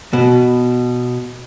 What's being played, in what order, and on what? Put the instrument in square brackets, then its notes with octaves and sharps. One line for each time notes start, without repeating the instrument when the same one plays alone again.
[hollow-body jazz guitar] B2